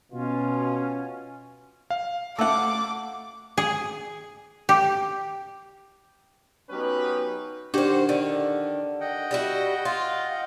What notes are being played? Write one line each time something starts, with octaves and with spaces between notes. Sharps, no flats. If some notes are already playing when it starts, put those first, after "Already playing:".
B2 C#4 F4
F5
A3 A4 F#5 D6
G#4
G4
F#3 B3 C#4 D#4 G4 B4
D#3 D4 F#4 G4 C5
D3
D#5 F#5 G5
G3 E4 F#4
F4